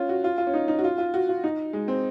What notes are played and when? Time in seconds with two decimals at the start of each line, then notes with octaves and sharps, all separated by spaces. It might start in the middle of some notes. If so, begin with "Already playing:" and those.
Already playing: C#4 F4
0.09 F#4
0.24 F4
0.38 F4
0.47 C#4
0.54 D#4
0.68 D#4
0.79 F#4
0.84 F4
0.98 F4
1.14 F#4
1.29 F4
1.44 D#4
1.73 G#3
1.88 C4